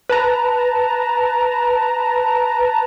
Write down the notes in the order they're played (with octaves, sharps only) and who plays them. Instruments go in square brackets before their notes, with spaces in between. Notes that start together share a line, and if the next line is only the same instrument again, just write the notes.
[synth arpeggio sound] B4 A5 A#5